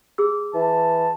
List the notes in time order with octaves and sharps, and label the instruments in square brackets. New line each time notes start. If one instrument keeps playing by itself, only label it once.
[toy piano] G#4 E6
[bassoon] E3 [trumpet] A5